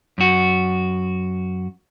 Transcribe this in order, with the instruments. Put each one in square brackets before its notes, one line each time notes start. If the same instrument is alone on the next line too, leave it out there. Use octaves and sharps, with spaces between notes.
[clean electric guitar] F#2 F#4